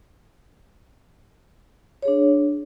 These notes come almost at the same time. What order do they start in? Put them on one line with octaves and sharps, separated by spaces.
C#5 G#4 D4